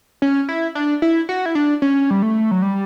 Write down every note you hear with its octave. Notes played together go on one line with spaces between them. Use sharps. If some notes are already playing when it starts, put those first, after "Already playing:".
C#4
E4
D4
E4
F#4
E4
D4
C#4
G3
A3
F#3
G3